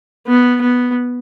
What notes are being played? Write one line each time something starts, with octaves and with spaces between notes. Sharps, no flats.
B3
B3